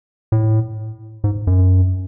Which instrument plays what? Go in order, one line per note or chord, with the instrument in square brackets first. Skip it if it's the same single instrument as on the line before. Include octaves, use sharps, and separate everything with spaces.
[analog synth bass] A2
G#2
F#2